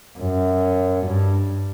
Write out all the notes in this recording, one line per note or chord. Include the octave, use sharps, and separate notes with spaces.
F#2
G2